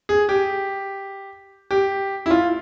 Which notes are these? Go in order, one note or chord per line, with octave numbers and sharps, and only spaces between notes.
G#4
G4
G4
E4
F4